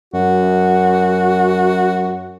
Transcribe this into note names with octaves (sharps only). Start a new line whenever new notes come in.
F#2 F#4